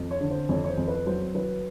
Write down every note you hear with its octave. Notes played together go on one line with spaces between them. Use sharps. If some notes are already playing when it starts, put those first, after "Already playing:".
Already playing: F2
C#5
D3
C5
F2 C#5
C#5
C5
F2
B4
F#3 C5
F#3 B4